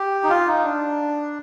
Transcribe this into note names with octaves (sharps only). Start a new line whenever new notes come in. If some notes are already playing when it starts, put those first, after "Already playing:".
Already playing: G4
D#4
F4
D#4
D4